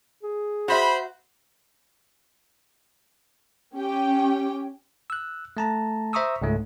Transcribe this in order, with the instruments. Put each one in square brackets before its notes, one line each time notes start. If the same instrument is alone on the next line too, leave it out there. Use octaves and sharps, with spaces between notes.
[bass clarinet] G#4
[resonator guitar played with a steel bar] F#4 E5 [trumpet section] C5 B5
[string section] C#4 G4 G5
[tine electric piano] E6 F#6
A3 A5 A#5
C5 E5 A#5 C#6 D#6 E6
C#2 G#2 A3